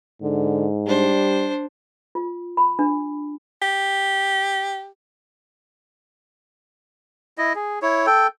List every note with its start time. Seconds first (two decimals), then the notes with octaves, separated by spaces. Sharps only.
0.22 G#2 D3
0.87 G3 D4 C5
2.15 F4
2.57 B5
2.79 D4
3.62 G4
7.38 E4 D#5
7.55 G#4
7.82 E4 C#5
8.06 A4 G5